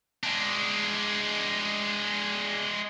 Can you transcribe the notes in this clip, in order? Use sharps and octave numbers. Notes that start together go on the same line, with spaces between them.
G#3 D4